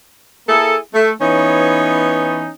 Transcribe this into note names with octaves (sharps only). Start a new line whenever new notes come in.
A#3 E4 G#4 A4
A3
E3 B3 C#4 D#4 C#5